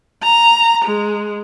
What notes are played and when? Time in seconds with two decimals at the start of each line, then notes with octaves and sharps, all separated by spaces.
0.23 A#5
0.85 G#3